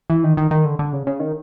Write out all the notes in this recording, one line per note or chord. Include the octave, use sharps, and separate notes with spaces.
E3
D#3
D#3
D#3
D3
D3
C#3
C#3
D#3